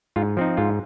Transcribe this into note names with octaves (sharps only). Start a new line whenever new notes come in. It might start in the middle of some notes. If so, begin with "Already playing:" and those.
G#2 F4
F3 C4 D#4
G#2 F4